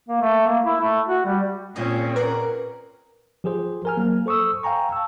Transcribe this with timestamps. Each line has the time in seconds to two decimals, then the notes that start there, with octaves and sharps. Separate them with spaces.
0.09 A#3
0.22 A3
0.47 A#3
0.65 E4
0.81 A3
1.08 F#4
1.25 G3
1.76 A#2 C4 C#4 G#4 D#5
2.16 A#4 B4 D5 F#5
3.44 F3 G4 G#4 C5
3.85 A#4 G#5 F6
3.97 F#3 A#3
4.26 A4 C5 C#6 D#6 E6
4.63 F5 G5 G#5 A#5 C#6
4.92 A5 E6